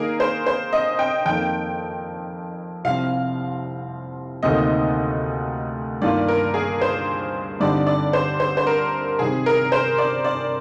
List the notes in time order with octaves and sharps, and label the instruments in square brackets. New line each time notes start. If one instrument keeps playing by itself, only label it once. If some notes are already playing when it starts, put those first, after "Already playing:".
Already playing: [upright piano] D#3 A#3 D#4 [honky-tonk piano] G#4 A#4
[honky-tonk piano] C5
C5
D#5
G5
[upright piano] F2 D#3 A#3 [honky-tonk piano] G5
[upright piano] C2 C3 F3 C4 [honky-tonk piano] F5
[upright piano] D2 C3 D#3 A#3 D#4 [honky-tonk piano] D#5
[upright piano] G2 D#3 A#3 F4 [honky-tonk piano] D5
[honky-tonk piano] A#4
G#4
C5
[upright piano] G2 D3 G3 C4 D#4 [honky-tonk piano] D5
[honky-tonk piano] D5
C5
C5
C5
A#4
[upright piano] C3 D#3 G3 C4 [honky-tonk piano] G#4
[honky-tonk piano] A#4
C5
D5
D5